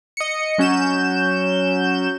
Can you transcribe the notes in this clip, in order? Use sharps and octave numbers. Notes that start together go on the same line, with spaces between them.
D#5 C#7
F#3 C#4 F#4 G6 E7